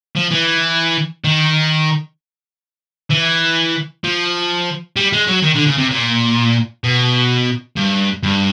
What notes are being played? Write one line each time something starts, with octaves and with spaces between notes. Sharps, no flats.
F3
E3
D#3
E3
F3
G3
G#3
F#3
D#3
D3
C#3
C3
A#2
B2
G2
G2